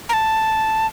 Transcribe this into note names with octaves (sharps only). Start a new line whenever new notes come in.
A#5
A5